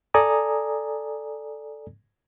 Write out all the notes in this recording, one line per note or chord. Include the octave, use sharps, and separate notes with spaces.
A4 D5 G#5 A#5 D#6